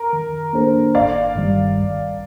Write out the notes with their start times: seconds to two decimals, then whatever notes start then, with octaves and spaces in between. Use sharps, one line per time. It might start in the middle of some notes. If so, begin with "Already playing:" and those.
Already playing: A#4
0.13 D#3
0.53 A#3 D4 A4 C5
0.95 G1 D5 F5
1.35 G2 D#3 G3
1.77 A#1